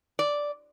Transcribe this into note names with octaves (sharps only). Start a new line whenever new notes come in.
D5